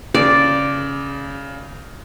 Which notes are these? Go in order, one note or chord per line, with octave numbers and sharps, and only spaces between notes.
C#3 D5